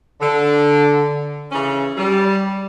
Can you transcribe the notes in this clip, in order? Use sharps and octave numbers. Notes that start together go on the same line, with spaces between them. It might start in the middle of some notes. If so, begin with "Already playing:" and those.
D3
C#3 E3 C#4
G3